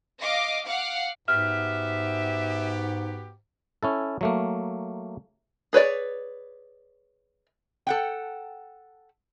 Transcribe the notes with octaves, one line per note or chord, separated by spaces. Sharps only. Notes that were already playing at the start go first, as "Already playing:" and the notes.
D#5 F5 D6
F5 F#5 D6
G#2 B3 F#4 G4 E5 F6
C#4 E4 A4
F#3 A3 A#3
G#4 B4 C#5 D5
A4 F#5 G5